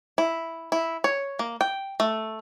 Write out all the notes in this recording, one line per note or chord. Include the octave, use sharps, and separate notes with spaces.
E4
E4
C#5
A#3
G5
A3